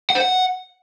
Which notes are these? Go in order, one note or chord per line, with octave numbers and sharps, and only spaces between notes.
F#5
C5
F#5